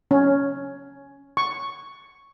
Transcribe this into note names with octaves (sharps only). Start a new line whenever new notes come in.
C#4
C#6